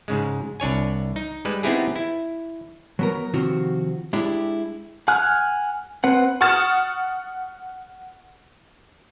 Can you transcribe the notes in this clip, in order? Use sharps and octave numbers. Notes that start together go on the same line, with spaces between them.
G#2 C#3 G#3
C2 D4 C#5 G#5
D#4
G3 G#3 B4
B3 C4 D#4 E4 G4 G#4
E4
F#3 B3 A#4
C3 D#3 F3 C4 F4 F#4
G#3 D4 E4 G4
F#5 G#5 F6 F#6
C4 B4 F#5
F#5 C#6 D#6 F6 A6 E7